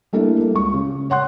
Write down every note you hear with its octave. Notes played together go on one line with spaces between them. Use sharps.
G3 A3 A#3 D4 E4
A#3
C#2 C#6
C#3
C#5 F#5 C6 F#6